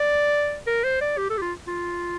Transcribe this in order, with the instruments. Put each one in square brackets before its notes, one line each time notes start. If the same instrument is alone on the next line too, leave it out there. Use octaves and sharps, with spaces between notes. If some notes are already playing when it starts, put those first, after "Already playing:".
Already playing: [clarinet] D5
A#4
C5
D5
G4
A4
G4
F4
F4